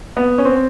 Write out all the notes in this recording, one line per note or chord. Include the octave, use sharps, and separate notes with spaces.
B3
C#4
C4